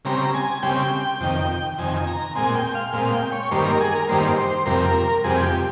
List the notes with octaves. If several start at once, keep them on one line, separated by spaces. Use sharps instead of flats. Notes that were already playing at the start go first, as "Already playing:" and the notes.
C#3 G3 C4 A#5
G#5
C#3 G3 C4 G5
F2 C3 D#3
F2 C3 D#3 G#5
A#5
A#2 G#3 C4 G#5
G5
F5
A#2 G#3 C4 F5
G5
C#5
G2 D#3 G3 A#3 C5
A#4
G#4
A#4
G2 D#3 G3 A#3 C5
C5
F2 C3 G3 A#4
F2 C3 G3 G#4
G4